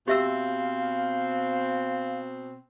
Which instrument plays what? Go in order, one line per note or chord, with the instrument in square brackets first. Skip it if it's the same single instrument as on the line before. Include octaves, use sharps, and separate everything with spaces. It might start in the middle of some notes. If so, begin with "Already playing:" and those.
[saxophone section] B2 C4 [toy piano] G4 E5 E6 [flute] F5